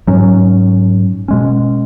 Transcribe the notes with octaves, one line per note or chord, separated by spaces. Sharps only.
G#2 F#3 C#4
B2 G#3 C#4